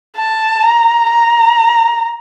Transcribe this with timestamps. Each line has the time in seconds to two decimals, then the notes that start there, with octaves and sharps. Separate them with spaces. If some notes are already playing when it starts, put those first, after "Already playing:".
0.17 A5
0.63 A#5
1.09 A#5